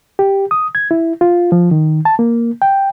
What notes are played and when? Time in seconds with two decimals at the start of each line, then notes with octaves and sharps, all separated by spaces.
0.19 G4
0.51 D#6
0.75 G#6
0.91 E4
1.21 F4
1.52 F3
1.71 D#3
2.05 A5
2.19 A#3
2.62 G5